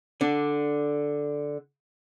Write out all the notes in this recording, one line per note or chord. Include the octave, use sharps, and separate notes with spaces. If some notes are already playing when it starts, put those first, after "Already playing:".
D3 D4